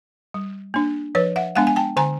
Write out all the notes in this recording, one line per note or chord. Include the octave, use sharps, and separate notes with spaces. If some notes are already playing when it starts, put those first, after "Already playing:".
G3
A#3 D4
F3 B4 C#5
E5 F#5
G#3 B3 D4 F#5 G#5
G#5
G5 A5
D3 G#5 A#5